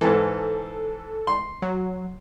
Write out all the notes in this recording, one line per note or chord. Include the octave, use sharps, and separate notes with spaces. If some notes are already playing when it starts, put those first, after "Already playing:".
G#2 E3 A4
C6
F#3